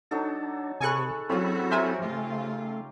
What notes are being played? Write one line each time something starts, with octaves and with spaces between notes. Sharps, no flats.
F#3 D4 D#4 A4
C3 G#4 A4 G#5 B5 C#6 F#6
F#3 C4 C#4 E4 F#4 A4 C#5
G4 A#4 C5 E5 G#5
C#3 A3 F4